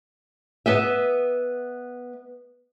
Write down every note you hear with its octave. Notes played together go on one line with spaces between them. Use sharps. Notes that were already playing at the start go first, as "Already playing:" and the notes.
B3 D#5 E5